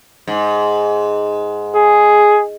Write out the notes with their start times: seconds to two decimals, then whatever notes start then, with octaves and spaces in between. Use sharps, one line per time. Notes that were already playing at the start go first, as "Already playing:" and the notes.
0.27 G#2
1.75 G#4